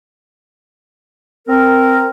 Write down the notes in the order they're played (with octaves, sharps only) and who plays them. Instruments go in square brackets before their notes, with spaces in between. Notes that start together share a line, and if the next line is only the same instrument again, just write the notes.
[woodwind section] C4 A#4